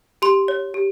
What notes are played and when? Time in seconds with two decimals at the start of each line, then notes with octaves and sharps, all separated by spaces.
0.22 G4 C6
0.48 C#5
0.74 G4